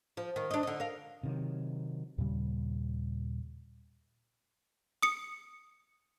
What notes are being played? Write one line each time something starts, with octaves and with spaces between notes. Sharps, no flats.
F3
D#3
D4 D#4
D3 D#4
A#4 F5
C3 D#3 F#3
D#2 A#2 C#3 G3
D#6 C#7